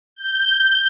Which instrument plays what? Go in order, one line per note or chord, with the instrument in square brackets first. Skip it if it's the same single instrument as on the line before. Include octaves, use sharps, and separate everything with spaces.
[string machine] G6